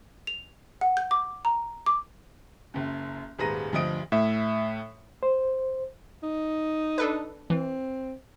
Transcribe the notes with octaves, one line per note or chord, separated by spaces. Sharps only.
F7
F#5
G6
D6
A#5
D6
F#1 F#2
D#1 G#2 B4 A#5 A#6 D#7
D2 G2 F3 D#5 D#6 D7
A2 E5
C5
D#4
D4 A4 B4
E3 C4